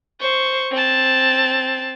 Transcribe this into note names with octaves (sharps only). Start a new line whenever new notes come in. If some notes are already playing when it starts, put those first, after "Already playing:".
C5 C#6
C4 A5